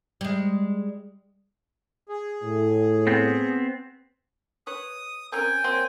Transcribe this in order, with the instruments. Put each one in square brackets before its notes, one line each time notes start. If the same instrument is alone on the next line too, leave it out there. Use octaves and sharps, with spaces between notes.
[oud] G3 G#3
[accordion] G#4
[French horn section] A2
[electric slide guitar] B3 C4
[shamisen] B4 C#5 [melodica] D#6
[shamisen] C4 C#4 A#4 [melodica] G5 G#5
[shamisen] F#3 A#3 C4